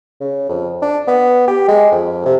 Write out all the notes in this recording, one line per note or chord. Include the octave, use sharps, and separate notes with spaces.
C#3
F2
D4
B3
G4
G#3
F2
C3